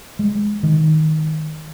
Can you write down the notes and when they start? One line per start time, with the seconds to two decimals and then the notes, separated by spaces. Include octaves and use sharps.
0.19 G#3
0.63 D#3